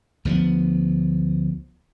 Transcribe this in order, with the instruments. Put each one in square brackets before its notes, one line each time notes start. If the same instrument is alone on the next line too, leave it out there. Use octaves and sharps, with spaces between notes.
[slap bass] D2 F3 G3 B3